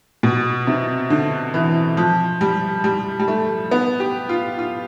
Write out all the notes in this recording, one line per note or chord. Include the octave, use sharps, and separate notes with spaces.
B2
C3
D3
E3
F3
G3
G3
G3
A3
B3
G4
F4
F4